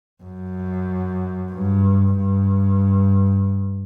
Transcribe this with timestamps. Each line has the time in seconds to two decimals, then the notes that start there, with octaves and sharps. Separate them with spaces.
0.23 F#2
1.52 G2
2.16 G2